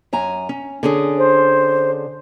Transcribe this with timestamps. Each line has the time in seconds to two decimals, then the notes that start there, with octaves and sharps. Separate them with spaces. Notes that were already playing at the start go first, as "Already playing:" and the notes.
0.13 F#2 G#5 A#5
0.49 C#4
0.83 D3 C#4 G#4
1.18 C5